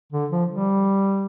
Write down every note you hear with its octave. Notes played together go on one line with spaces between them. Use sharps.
D3
F3
G3